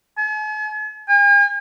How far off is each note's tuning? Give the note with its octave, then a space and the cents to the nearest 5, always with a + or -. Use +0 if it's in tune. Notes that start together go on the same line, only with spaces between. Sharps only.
G#5 +45
G#5 -45